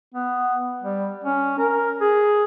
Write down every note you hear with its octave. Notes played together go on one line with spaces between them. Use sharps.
B3
G3
C#4
A#4
G#4